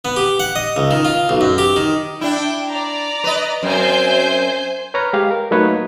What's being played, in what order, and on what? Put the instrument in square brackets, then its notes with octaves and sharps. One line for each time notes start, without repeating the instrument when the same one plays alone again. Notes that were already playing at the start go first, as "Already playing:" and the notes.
[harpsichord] B3
G4
F#5
D#5
C#2
D#3
F4
B1
F#2
G4
D#3
[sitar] D4 E4 [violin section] G5
[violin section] D5 A#5
[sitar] B4 D#5
[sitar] F#2 C4 [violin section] C5 G#5 G6
[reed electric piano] B4 C#5 A#5 F6
G#3 G4 F5
A#4
F#3 A3 A#3 D#4 B4 C#5